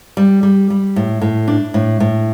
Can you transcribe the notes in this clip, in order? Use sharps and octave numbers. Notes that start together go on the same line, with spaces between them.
G3
G3
G3
A2
A2
D4
A2
A2